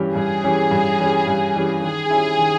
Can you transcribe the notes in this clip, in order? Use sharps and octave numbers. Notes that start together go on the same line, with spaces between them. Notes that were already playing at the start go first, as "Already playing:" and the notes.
Already playing: G2 E3 G3 C#4 G4
G2 G#4
E3 G3 C#4 G4
G2
E3 G3 C#4 G4
G2
E3 G3 C#4 G4
D#3 G#4
G3 C#4 E4
D#3